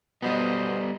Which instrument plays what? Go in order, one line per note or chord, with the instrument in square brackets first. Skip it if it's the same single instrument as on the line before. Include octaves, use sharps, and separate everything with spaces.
[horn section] B2 C5 D#5 [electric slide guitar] G3 B3